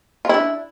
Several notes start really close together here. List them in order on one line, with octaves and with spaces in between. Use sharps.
F4 E4 D4